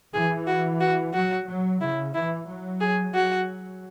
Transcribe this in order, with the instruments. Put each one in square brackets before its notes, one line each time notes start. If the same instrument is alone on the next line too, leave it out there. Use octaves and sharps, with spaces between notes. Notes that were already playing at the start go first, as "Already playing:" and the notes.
[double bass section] E3 [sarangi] G#4
[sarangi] F#4
F#4
[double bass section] F#3 [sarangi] F#4
[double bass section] F#3
[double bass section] C#3 [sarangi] E4
[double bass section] E3 [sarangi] E4
[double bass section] F#3
[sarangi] G#4
[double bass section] F#3 [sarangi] F#4